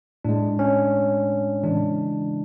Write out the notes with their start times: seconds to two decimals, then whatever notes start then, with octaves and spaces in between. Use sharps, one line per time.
0.25 A2 G#3 D4
0.59 C#4
1.63 C#3 E3 G#3 D4